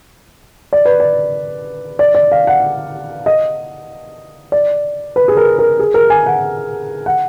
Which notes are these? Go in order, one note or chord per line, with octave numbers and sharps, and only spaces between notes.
D5
B4
D5
D5
D5
F5
F#5
D#5
D5
B4
G#4
A#4
A#4
G#4
A#4
G#5
F#5
F#5